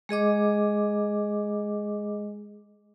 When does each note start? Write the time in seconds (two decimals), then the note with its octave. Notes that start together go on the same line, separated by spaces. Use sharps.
0.09 G#3 G#4 D#5 D6